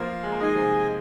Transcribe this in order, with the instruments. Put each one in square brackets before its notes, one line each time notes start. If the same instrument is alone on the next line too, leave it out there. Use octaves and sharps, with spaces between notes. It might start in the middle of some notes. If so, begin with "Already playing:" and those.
Already playing: [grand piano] F3 A#3 [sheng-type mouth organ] F4
[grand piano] G#3
A#3
[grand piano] D#3 G#3 [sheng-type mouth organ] G#4 D#5 G#5
[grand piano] C3 F3